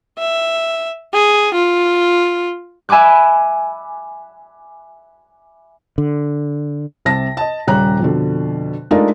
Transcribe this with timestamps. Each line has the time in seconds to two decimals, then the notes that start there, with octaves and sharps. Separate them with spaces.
0.18 E5
1.14 G#4
1.54 F4
2.89 E5 G#5 B5 D6 F#6
5.98 D3
7.05 C2 C3 A5 A#6
7.37 D#5 A5
7.67 D#1 C#3 G3 C#4 A#5 F#6
8.00 F2 B2 D3
8.91 G#3 A3 D4 D#4 F4 A#4